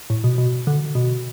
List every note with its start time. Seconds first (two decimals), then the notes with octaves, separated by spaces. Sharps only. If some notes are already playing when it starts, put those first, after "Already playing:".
0.10 A2
0.24 B2
0.38 B2
0.67 D3
0.95 B2